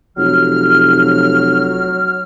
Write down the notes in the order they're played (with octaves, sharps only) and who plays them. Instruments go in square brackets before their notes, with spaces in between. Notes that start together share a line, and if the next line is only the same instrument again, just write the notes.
[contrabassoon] F1 [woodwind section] F#3 F6